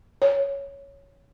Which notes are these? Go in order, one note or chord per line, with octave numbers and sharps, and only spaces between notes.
C#5